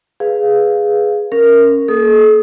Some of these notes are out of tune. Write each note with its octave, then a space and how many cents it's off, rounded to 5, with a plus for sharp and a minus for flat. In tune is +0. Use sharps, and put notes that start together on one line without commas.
G#4 +0 B4 +0 F5 +0
C#4 +0 A#4 +0
A#3 +0 A4 -45 D#6 +0